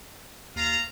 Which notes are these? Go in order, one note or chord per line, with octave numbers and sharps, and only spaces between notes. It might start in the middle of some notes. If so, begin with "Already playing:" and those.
D#2 F4 F5 A#5